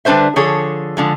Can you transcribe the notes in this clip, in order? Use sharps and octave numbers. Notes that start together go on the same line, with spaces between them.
D3 G3 D4 B4 C5 E5
D3 F3 G#4 A4 C#5
D3 F3 G#3